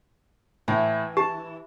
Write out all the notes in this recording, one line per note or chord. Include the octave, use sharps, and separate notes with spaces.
A2 E3
G4 A5